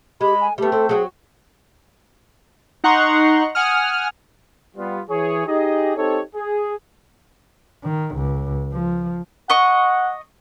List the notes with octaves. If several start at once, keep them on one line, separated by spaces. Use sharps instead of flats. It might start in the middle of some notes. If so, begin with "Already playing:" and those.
G#3 G4 B5
G#5
G3 A3 B3 G4
C4 A4
F#3 F#4 G#4
D#4 F#5 A#5 C6 C#6
F#5 G#5 D#6 F6
G3 B3 F4
E3 G#4 C#5
D#4 G4 G#4 D#5
C4 D#4 G4 A4 C#5
G#4
D#3
C#2
F3
D#5 F#5 C#6